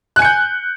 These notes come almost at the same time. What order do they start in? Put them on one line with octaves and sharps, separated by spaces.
F#6 G#5 C#7 G6